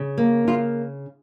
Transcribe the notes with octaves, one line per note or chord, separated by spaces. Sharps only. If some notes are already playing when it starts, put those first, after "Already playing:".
Already playing: C#3
A#3
C#3 F4